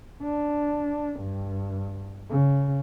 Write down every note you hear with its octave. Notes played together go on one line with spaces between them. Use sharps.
D4
G2
C#3